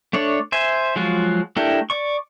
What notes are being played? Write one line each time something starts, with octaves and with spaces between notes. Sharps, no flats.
A3 D4 C#5 D5
C5 E5 G#5
F3 F#3 G#3 F4 F#4
A3 D4 E4 G4 A#4
D5 C#6